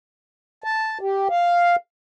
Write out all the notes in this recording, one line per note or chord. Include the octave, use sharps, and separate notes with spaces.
A5
G4
F5